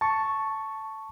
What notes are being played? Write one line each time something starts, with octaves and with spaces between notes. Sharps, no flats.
A5 C#6